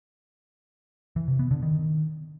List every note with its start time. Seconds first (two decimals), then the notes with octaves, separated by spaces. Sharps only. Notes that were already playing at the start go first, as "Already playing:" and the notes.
1.16 E3
1.28 C3
1.39 B3
1.51 D3
1.63 D#3